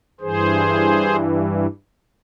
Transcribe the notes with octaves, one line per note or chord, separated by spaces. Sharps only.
G2 E3 G#4 C5